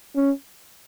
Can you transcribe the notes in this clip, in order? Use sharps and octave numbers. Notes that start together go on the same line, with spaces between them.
C#4